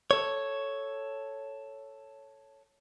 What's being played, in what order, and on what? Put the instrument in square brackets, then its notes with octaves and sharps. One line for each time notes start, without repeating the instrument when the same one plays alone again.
[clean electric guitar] A4 C#5